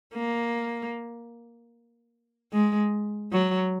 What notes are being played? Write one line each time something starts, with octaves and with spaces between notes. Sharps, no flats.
A#3
G#3
F#3